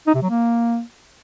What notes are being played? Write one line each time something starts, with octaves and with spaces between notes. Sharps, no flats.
D#4
C3
F#3
A#3